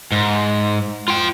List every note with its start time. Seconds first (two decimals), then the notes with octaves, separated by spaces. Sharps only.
0.12 G#2
1.08 F4 G5